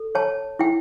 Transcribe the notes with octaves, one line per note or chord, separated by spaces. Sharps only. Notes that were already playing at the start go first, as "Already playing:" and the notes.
Already playing: A4
C#5 A5
E4 G5